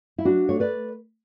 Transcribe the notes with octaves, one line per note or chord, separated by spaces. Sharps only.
E4
F#3 D4 F#4
A3 C#5
B4 D5